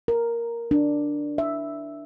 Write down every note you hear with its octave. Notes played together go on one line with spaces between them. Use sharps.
A#4
D4
E5